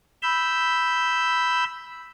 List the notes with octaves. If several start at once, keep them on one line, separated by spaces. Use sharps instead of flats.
B5 E6 G6